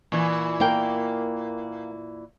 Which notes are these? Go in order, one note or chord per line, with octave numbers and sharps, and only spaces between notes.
A#2 E3
A#3 A#4 G5